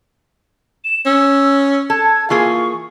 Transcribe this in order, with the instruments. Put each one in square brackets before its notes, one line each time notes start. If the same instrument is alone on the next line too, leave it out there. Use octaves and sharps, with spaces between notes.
[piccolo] E7
[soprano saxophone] C#4 [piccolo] E6
[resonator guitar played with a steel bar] A4 [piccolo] G#6
[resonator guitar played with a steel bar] E3 A#3 G#4 [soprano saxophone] F4 [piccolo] C#6